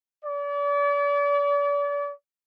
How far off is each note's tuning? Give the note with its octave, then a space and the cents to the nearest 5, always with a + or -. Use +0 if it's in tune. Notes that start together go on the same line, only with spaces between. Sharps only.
D5 -40